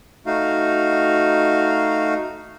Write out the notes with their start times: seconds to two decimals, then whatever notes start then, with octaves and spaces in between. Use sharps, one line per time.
0.26 A3 D#4 F#4 F5